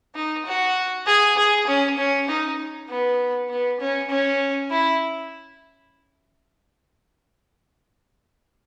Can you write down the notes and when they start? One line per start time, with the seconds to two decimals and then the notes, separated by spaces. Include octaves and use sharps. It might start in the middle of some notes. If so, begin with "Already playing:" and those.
0.15 D#4
0.46 F#4
1.07 G#4
1.37 G#4
1.68 C#4
1.98 C#4
2.29 D#4
2.89 B3
3.50 B3
3.80 C#4
4.10 C#4
4.71 E4